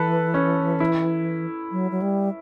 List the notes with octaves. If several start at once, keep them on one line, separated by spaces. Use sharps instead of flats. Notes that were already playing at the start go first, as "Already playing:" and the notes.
Already playing: E3 A4 B4
C#4
E4
F#3
F#3
G3